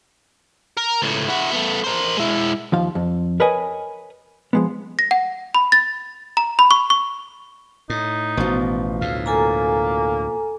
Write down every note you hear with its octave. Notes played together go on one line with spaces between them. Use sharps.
A#4
C#2 A2
E4 F#4
A3 B3
A#4 C5
G#3 E4
D#2 F3 F5
F2
A#4 B4 C#5 D#5 G#5
F3 G#3 B3
A#6
F#5
B5
A6
A#5
B5
C#6
C#6
A2 D#4
A1 B2 F3
D2 A2 F5
A#3 A4 G#5 A#5